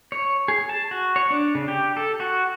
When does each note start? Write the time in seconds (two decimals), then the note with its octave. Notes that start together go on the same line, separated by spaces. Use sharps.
0.12 C#5
0.48 G#4
0.69 A5
0.91 F#4
1.16 C#5
1.30 D4
1.55 C#3
1.68 G4
1.97 A4
2.20 F#4